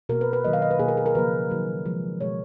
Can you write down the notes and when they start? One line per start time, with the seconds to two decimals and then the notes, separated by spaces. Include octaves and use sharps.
0.09 B2 A#3 A#4
0.21 B4
0.33 B4
0.44 D#3 F#3 A#3 D#5
0.53 F5
0.62 D#5
0.71 B4
0.79 B2 A#3 G#4
0.88 A#4
0.97 G#4
1.06 A#4
1.15 C#3 F3 A#3 B4
1.50 D#3 F#3 A#3
1.86 C#3 F3 G#3
2.21 B2 G#3 C#5